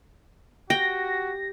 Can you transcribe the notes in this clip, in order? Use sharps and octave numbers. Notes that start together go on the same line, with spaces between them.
F#4 G4 G5 A#6